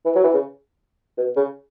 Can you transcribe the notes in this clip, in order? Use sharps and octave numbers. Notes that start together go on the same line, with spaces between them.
E3
F#3
E3
C#3
B2
C#3